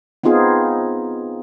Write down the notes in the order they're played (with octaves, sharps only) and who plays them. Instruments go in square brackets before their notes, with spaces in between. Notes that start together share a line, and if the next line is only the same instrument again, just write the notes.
[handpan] B3 C4 D#4 F4 G#4